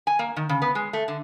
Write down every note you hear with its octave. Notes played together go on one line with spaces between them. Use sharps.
G#5
A#3
D#3
C#3
B3
G#3
A3
D3